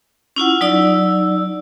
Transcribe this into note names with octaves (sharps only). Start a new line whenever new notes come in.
C#4 E4 F4 F#5
F#3 D#4 D5 E6